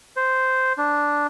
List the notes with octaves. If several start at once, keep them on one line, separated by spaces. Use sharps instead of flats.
C5
D4